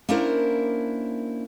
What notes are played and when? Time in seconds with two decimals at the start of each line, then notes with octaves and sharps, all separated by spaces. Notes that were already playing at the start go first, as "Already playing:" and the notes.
0.09 A#3 C#4 D4 E4 A#4 C5